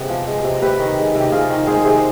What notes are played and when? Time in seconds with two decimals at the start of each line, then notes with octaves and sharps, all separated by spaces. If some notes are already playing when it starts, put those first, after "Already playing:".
Already playing: C3 G#3 B3 G4
0.09 F3
0.27 G#3
0.44 C3
0.62 C3 G4 B4
0.80 D#3
0.98 G#3
1.15 C3
1.21 G4
1.32 C3 F4 G#4
1.50 D#3
1.67 G#3 G#4 C5
1.85 C3 G#4 C5